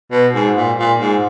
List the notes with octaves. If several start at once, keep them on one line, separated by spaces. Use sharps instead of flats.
B2
G#2
A#2
A#2
G#2